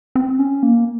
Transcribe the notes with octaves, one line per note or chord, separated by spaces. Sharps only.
C4
C#4
A#3